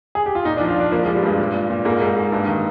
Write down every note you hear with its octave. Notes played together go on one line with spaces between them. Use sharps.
G#4
G4
F4
A#2 D#4
D4
F3
F4
F3 D4
F3 A#3
G#3
F3
G3
G2 G#3
A#2
A#2
A#2
G#2 A#3
G#2
G#2
G2
D#3